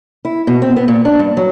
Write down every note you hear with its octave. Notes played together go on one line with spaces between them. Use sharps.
E4
B2
C4
B3
A#2
D4
G2
F#3